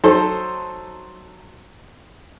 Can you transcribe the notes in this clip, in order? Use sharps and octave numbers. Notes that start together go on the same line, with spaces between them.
F#3 D#4 A4 C5